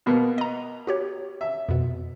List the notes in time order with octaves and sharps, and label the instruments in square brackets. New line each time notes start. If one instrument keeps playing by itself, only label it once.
[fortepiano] B2 A#3 B3
[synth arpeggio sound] D#5 A#5
F#4 G4 C#5
[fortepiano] E5
[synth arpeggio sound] F2 B2